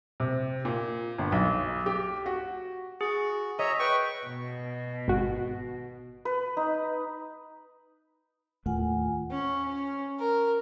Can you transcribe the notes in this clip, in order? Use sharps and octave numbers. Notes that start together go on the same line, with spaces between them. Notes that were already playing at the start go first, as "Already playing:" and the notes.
C3
A#2
G1
B1
G4
F#4
F#4 G#4
C#5 D#5 E5 A#5
B4 G5 C#6
B2
G#1 F#4
B4
D#4
D#2 A2 A3 F4 F#5 G#5
C#4
C#4
A#4